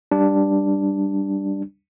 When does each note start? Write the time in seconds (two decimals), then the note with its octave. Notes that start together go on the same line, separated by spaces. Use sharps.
0.11 G3 D4